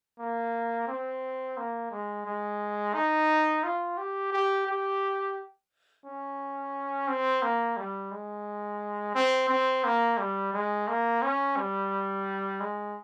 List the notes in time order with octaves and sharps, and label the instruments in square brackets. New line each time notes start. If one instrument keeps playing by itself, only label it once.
[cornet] A#3
C4
A#3
G#3
G#3
D#4
F4
G4
G4
G4
C#4
C4
A#3
G3
G#3
C4
C4
A#3
G3
G#3
A#3
C#4
G3
G#3